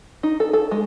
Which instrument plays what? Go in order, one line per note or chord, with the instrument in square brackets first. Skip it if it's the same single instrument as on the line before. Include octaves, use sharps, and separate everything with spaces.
[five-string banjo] D#4
A4
A4
G#3